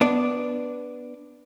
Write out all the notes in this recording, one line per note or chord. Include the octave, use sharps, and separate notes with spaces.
B3 D4 D5